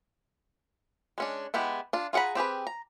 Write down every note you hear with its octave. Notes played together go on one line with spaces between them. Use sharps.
G#3 C#4 D4
G#3 B3 E4 G4
D4 F4
F4 G#4 F#5 A#5 B5
C4 G4 G#4 B4
A#5